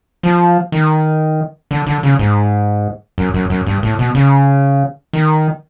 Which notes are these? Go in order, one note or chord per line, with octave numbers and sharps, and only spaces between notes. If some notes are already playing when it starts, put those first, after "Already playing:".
F3
D#3
D3
D3
C#3
G#2
F#2
F#2
F#2
G2
A2
B2
C#3
D#3